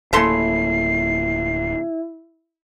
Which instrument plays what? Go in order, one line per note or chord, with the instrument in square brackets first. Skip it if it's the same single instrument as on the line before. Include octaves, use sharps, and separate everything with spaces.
[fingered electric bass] D1 A#3 [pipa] C#3 A3 C6 [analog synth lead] E4 [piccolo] C7